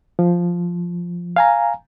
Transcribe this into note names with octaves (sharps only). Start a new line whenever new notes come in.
F3
F5 G#5 A#5